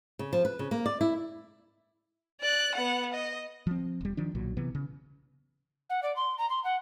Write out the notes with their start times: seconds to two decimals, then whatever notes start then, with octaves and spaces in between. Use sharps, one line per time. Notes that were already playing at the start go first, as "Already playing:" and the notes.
0.19 C#3
0.33 F3
0.45 B4
0.59 C#3
0.71 A#3
0.86 D5
1.01 E4
2.41 D5 F#6
2.76 B3 F#5
3.14 D#5
3.67 F3 C4
4.01 E1 G3
4.17 D#3 F3 D4
4.35 B1 A#2 F#3
4.57 C3 E3 B3
4.75 C#3
5.90 F#5
6.03 D5
6.16 C6
6.38 A#5
6.49 C6
6.64 F#5